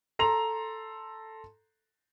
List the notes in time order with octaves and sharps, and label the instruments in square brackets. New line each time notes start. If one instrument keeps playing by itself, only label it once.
[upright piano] A4 A#5 C6 F7